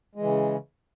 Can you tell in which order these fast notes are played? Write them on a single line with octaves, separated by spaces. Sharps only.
G#3 E3 C#3